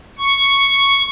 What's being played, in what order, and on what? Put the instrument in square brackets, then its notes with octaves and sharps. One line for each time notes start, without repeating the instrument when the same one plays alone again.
[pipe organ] C#6